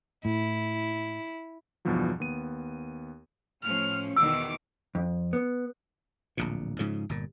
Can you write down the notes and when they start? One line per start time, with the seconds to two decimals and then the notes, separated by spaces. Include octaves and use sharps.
0.25 A2 E4
1.85 E2 G2 B2 D#3 F3 F#3
2.20 D#2 B3 D#7
3.62 A2 F3 C#4 F6
4.16 E2 B2 D#3 D6 E6
4.95 F2
5.33 B3
6.37 D1 A#1 A#2
6.79 G#2 C#3 F3
7.09 G1 A#2